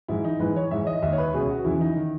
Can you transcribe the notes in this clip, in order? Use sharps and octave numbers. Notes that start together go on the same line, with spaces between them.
G#2 E3 E4
D#4
G#2 E3 B4
C#5
G#2 E3 E5
D#5
D#2 D#3 E5
C#5
B4
C#2 B2 G#4
F#4
E2 C#3 E3 E4
D#4
D#3